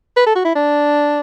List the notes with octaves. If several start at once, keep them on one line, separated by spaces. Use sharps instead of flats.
B4
A4
F#4
E4
D4